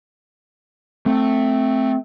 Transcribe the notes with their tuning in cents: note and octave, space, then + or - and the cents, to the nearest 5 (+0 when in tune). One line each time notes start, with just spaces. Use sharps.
A3 +0 C4 +0